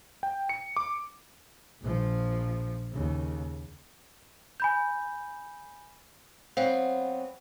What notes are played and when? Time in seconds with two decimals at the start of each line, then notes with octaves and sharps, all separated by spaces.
0.23 G5
0.49 C#7
0.76 D6
1.81 A#1 F3
2.92 D#2 C#3
4.60 G#5 B5 G6
6.57 F#3 B3 C4 F5